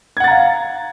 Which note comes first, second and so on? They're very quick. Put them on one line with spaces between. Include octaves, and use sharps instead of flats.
G#6 F#5 A6 A#5 F5